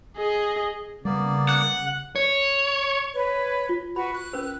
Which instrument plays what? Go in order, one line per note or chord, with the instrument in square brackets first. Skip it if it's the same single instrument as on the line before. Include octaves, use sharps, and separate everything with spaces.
[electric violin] G#4 D#5
[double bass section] C#3 [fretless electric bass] G3 [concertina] A#3 B3 D5
[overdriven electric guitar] F#5
[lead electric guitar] C#5
[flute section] B4 C#5
[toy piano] F4
[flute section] F#4 B4 [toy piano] B5
[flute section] F#6
[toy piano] C#4 A#4 B4